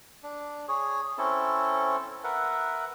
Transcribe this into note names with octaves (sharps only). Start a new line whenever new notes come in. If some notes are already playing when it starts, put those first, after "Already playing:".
D4
G#4 C#5
C4 C#4 E4 A4
A#4 B4 E5 F#5